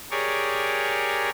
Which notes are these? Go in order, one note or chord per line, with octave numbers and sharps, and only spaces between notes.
G4 G#4 A#4 C#5 D5